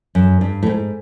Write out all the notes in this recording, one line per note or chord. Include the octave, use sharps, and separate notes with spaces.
F#2
G2
A2
G#2